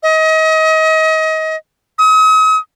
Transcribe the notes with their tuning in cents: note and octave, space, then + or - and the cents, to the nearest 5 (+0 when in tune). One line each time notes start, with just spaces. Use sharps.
D#5 +30
D#6 +40